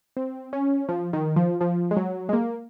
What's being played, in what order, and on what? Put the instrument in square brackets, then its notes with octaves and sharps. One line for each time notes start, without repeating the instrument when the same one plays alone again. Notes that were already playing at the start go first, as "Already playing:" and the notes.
[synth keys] C4
C#4
F3
D#3
F3
F3
G#3
F#3
G#3
A#3